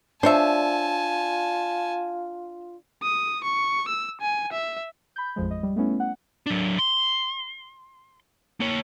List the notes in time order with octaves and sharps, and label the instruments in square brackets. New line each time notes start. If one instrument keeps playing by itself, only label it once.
[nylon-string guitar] D4 [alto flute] F4 [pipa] C5 C#5 E5 [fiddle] G#5 A5
[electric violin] D#6
C#6
E6
G#5
E5
[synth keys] B5 G6
A1 F2 F3 G#3
D#5
G3
A3 B3 C#4 E4
F#5
[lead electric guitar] F#3 D4
C6
A#3 C#5